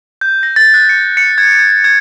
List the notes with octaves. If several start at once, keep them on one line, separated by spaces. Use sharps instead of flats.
G6
A#6
A6
F#6
C#7
C#7
G#6
G#6
G#6